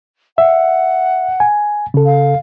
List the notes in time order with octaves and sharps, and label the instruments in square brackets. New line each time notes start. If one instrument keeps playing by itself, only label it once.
[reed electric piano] E5 [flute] F#5
[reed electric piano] G#5
C#3 A4
[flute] F5